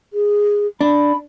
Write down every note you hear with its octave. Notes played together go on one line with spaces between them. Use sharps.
G#4
D4 B5